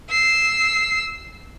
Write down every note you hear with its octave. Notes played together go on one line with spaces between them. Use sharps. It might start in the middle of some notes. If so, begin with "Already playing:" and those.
E6 C7